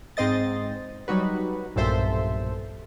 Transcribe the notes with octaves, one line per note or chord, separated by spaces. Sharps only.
G#2 C4 C5 D#5 A6
F#3 G3 D#4 F#4 B4
B1 G2 A#2 A4 C5 E5